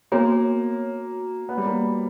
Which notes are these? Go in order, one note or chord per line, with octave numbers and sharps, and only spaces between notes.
A#3 B3 F#4 C#5
B3
G3
A#3